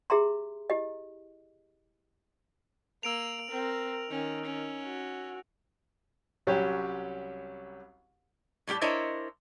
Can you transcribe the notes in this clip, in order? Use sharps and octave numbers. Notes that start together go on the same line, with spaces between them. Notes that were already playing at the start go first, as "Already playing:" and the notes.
G4 G#4 E5 A#5 C6
E4 G4 D#5
A#3 E6 D7 F7
C4 A#4
D#3 C#4
C#4
F#4
C2 F#3 G3 C#4 G4
A2 G3 A3 G4
D4 E4 A#4 C5 C#5 D#5